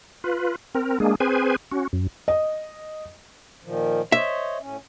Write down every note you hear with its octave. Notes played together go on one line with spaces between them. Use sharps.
F4 B4
C4 A#4
G#3 A#3 D4 G#4
C4 G#4 B4 C5 G#5
C#4 F#4
F#2
D#5
A#2 D#3 F3
C5 C#5 D#5 E5
A2 C#4